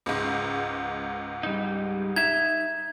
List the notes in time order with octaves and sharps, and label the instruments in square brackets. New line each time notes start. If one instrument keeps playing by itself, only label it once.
[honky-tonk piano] C#2 G#2
[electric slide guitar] G3 D#4
[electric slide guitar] D#4 E5 [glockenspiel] G#6